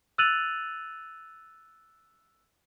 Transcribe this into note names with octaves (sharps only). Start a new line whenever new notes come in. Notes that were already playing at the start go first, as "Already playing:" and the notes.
E6 F#6 A6 D#7 F7 F#7